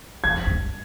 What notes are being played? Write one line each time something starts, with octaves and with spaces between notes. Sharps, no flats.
F2 G#6
G2